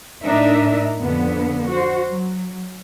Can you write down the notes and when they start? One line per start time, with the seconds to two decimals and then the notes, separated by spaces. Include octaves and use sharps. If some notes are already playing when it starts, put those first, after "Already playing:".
0.24 A2 D4 D#4 A#4 E5
0.99 F2 D3 B3
1.69 F#4 C5
2.08 F#3